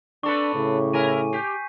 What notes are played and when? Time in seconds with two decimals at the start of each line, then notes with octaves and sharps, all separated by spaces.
0.23 C4 D4 A4 B4 C#6 D6
0.55 A2 C#3
0.93 E4 A#4 G#5 D#7
1.33 G4 G6 B6 C7